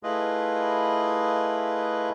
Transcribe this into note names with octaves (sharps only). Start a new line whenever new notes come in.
A3 E4 F4 G#4 B4 D#5